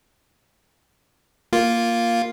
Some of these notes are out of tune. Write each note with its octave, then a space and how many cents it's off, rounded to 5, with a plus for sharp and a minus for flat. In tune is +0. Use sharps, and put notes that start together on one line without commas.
A#3 +0 F4 +0